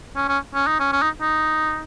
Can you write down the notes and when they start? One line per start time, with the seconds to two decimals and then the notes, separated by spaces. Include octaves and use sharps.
0.16 C#4
0.29 C#4
0.55 C#4
0.67 D#4
0.80 C#4
0.93 C#4
1.02 D#4
1.22 D#4